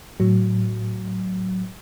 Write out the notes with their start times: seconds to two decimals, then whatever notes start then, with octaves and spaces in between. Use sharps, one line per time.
0.20 A2 F#3